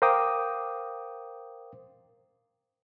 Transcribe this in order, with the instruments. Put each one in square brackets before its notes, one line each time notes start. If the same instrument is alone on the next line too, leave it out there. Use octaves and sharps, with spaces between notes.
[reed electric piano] A#4 C5 F5 G5 D6 D#6